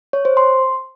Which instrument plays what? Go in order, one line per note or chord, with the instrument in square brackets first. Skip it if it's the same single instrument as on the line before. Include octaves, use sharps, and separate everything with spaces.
[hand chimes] C#5
C5
C6